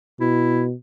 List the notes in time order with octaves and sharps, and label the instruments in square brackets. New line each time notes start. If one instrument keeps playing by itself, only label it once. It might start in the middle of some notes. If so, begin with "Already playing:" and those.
[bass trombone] B2 [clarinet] E4